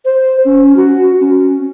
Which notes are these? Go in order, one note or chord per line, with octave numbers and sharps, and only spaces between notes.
C5
C#4
F#4
C#4